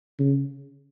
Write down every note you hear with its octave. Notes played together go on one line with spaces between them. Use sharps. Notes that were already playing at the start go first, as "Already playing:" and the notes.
C#3